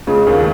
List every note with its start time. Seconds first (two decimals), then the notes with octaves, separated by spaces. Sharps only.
0.07 C#2 C#3
0.27 D#2 D#3